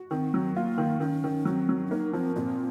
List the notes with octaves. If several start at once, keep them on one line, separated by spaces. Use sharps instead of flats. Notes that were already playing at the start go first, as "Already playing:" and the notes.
Already playing: F#4
D#3 C4
F#3
A#3 F4
D#3
D#3 C#4
D#3
F#3 C4
F#3
C#4
A#3 D#4
F3 C4
A#2 C4